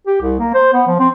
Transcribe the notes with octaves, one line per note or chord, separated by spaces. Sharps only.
G4
C2
A#3
C5
B3
F3
C4